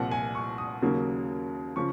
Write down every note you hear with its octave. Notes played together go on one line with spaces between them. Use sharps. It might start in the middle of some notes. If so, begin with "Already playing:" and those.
Already playing: C2 A#2 F3 F#5
G#5
C#6
D#6
D#2 C#3 F#3 A#3
C#3 F3 C#6